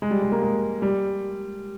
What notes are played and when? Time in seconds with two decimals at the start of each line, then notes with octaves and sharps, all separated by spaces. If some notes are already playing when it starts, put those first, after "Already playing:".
0.02 G#3
0.11 G3
0.22 G#3
0.32 A#3
0.42 G#3
0.82 G3